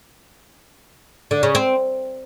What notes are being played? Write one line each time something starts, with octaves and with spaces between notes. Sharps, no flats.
D3
C#3
C4